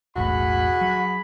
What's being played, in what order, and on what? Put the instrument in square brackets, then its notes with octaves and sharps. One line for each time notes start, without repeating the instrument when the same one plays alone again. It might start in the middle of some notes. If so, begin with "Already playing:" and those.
[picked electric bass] E1 B1 A2 [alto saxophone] F#4 [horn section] G#4 B5
[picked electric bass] F#3